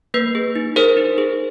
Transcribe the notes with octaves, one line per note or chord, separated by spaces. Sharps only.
A#3 B4
G#4
D#4
G#4 A#4 C5
D#4
G#4